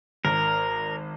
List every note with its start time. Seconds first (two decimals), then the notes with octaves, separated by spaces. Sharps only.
0.25 G#1 A#4